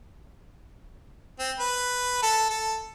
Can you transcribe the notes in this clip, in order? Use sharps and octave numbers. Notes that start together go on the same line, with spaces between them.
C4
B4
A4
A4